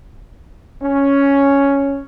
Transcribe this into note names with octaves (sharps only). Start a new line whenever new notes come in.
C#4